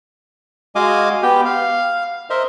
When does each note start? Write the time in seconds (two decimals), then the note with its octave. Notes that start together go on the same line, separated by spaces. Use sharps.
0.75 G#3 F#4 D#5 F5 G#5 D6
1.23 B3 G4 G5
1.45 F5
2.30 A#4 C5 D#5 E5